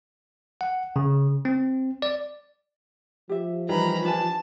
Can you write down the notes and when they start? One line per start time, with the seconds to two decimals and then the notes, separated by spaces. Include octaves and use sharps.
0.61 F#5
0.96 C#3
1.45 C4
2.02 D5
3.29 F3 G4 E5
3.69 D#3 E3 G3 A#5 B5
4.04 D4 G#5 A5